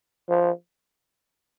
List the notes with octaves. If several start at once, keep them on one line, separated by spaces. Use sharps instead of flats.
F3